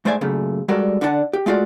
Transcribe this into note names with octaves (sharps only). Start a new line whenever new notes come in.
G#2 A3 C5 D5 E5 G#5
F#2 A#2 C#3 A3
G3 G#3 F#4 A4 A#4 D5
D3 D4 E4 D5 F#5 A5
G4
G#3 A3 F4 F#4 D5